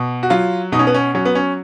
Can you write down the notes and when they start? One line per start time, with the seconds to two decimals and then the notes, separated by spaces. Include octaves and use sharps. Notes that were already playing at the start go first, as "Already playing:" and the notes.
Already playing: B2
0.23 F#4
0.30 F#3 F4
0.72 B2 D#4
0.79 C#4
0.87 B3
0.94 C#4
1.15 F#3 C#4
1.25 B3
1.35 C#4